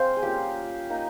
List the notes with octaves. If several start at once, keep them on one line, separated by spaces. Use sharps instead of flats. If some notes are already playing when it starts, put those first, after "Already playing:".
Already playing: G#3 C4 C5 F5
G#4
G3 A#3 C#4 F4 G4
A#3 D#4